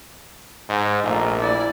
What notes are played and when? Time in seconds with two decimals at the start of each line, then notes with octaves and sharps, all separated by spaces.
0.69 G#2
1.04 A#1 A3 A#4
1.40 E4 D5